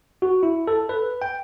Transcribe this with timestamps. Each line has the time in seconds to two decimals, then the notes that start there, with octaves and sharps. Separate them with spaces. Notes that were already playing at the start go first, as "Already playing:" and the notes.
0.22 F#4
0.43 E4
0.67 A4
0.89 B4
1.22 G5